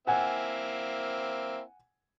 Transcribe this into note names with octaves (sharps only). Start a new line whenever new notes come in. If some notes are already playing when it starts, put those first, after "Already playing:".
A#3 C4 E4 F#5 G#5